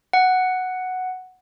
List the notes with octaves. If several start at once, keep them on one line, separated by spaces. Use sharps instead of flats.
F#5